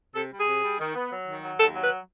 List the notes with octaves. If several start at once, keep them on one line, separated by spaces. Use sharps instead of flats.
C3 A4
G3
G#4
C3
G3
D#3
B3
F#3
D#3
F#3
D#2 A4
F#3
B4